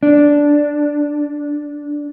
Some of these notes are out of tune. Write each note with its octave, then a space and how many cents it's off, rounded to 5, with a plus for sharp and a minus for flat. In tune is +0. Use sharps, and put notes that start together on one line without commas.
D4 -5